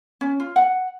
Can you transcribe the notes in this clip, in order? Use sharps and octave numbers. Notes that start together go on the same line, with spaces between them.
C#4
F4
F#5